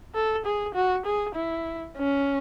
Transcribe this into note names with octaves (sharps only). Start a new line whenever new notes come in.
A4
G#4
F#4
G#4
E4
C#4